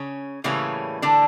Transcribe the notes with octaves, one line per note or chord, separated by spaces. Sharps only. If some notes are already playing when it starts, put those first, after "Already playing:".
Already playing: C#3 C#4
A2 C#3 E3 G3 A#3 C#4
D3 D4